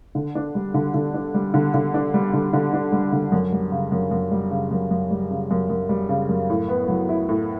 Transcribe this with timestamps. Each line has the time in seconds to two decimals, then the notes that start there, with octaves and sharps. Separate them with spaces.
0.15 D3
0.35 D4
0.55 G3
0.74 D3
0.94 D3
1.14 D4
1.34 G3
1.54 D3
1.74 D3
1.94 D4
2.14 G3
2.33 D3
2.53 D3
2.73 D4
2.92 G3
3.13 D3
3.32 F#2
3.52 G3
3.72 C#3
3.92 F#2
4.11 F#2
4.31 G3
4.51 C#3
4.71 F#2
4.91 F#2
5.11 G3
5.31 C#3
5.51 F#2
5.69 F#2
5.89 G3
6.09 C#3
6.29 F#2
6.50 A2
6.68 B3
6.88 F#3
7.09 E4
7.29 A2